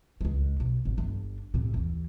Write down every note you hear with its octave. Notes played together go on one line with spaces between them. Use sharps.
C#2 G#3
B1
G#1 G2
G1 D4
A2 C3
D#2 E3